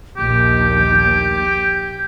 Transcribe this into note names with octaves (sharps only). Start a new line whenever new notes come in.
A#1 D#2 G4 G6